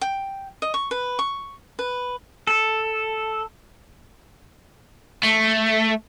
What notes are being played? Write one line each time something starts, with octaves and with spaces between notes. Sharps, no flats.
G5
D#5
C#6
B4
C#6
B4
A4
A3